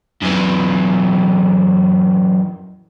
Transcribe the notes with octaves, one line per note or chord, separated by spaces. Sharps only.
F#2 E3